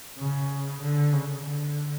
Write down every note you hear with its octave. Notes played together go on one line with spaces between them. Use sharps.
C#3
D3
C#3
D3